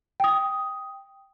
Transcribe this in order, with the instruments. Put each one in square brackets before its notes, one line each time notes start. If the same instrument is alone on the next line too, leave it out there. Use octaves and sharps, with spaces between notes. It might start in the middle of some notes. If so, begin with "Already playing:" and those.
[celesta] G5 D#6